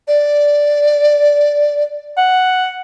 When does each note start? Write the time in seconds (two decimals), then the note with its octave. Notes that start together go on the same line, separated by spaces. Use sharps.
0.08 D5
2.17 F#5